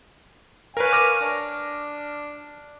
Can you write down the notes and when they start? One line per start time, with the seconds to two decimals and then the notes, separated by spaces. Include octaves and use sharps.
0.77 A#4 B4 C#5 F5 G#5
0.93 D6 F6 A#6
1.21 D4